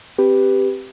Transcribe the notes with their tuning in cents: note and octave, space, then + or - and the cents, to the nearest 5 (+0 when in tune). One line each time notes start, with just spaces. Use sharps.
C4 +0 G4 +0 B4 +0